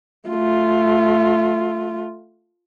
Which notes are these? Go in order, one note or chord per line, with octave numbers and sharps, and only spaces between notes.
A3 F4